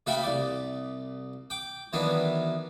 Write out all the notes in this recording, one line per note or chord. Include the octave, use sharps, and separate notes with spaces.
C#3 A3 F#4 E5 G5 B5
C2 D5
G5 D6
D#3 E3 F#3 B3 D4